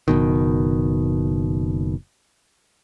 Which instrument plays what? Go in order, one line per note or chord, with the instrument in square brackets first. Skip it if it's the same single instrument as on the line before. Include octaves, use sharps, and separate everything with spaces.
[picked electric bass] F#1 B2 D#3